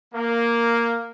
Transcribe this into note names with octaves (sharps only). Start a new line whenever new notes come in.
A#3